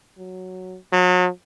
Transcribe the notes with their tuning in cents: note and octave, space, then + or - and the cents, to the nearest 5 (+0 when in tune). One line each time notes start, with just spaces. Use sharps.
F#3 +0
F#3 -35